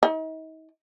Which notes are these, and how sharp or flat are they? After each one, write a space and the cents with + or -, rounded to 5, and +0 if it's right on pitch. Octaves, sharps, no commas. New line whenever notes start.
D#4 +40